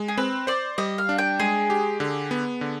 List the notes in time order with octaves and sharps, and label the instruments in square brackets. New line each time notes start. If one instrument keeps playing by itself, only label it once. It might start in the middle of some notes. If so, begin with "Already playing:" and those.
Already playing: [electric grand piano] G#3
[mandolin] G#4
[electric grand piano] C4 [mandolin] B4
[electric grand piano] C5 [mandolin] D5
[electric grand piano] G3 [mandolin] D#5
[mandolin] F5
[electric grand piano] D4
[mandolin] G5
[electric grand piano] G#3 [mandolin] G#4
[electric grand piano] G4
D3
B3
D3